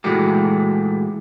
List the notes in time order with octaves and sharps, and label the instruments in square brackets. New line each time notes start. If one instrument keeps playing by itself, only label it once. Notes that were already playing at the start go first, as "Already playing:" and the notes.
[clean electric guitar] A#2 E3 G#3 A3 F#4 G4